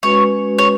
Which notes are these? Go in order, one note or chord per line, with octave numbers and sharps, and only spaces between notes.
G#3 C#4 F#4 B4 C#5
C#5